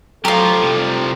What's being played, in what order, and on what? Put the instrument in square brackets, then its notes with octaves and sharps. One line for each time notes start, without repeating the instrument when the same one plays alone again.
[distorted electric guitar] F3 G4 [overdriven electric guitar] F#3 [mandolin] F4 A#4 [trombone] A4
[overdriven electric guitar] C3 G3